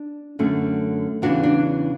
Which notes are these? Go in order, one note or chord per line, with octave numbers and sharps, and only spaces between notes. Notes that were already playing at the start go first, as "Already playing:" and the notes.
Already playing: D4
F#2 D3 A3 C#4
E2 C#3 E3 D4 F#4
D4